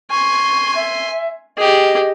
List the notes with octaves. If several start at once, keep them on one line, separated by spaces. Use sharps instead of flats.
G#5 C6 C#6
E5
G4 G#4 D#5